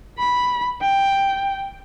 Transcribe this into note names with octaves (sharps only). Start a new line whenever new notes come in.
B5
G5